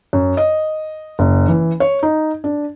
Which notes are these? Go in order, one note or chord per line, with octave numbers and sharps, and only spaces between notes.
F#2
D#5
F#1
E3
C#5
D#4
D4